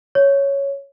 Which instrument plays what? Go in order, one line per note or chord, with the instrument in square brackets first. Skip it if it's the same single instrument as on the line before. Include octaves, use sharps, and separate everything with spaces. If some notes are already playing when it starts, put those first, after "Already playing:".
[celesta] C#5